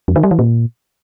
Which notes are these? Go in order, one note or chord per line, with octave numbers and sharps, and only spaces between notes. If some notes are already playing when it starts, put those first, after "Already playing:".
F2
D#3
G3
E3
A#2